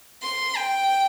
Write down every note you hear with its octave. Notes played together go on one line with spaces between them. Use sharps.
C6
G5